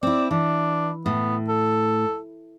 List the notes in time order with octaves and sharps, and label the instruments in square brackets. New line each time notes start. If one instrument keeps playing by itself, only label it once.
[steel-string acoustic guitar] C4 E4 [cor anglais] D5
[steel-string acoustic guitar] E3 [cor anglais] D4
[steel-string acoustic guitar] A2 [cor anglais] B3
[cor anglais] A4